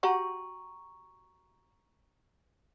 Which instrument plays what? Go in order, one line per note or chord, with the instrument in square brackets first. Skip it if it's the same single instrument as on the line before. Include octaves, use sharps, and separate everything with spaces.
[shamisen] F#4 G4 F#5 [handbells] A#5 C#6